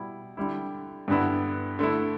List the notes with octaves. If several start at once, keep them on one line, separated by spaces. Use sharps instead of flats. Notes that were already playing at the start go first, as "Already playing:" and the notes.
Already playing: B2 G3 E4
D3 G3 E4
G2 D3 B3 E4
D3 A3 E4